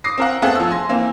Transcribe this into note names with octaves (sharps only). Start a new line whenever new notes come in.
D6 D#6 A#6 C7
C4 A#4 F#5
A3 B3 C4 G#4 A4 F#5
F3 E6
G#5 C6 A#6
E3 A#3 C4